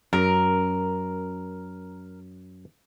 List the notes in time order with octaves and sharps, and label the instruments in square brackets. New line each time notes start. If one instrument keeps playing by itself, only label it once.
[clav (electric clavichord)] F#2 [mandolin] A#4